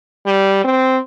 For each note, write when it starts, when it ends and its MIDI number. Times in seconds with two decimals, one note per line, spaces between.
0.26 0.60 55
0.64 0.98 60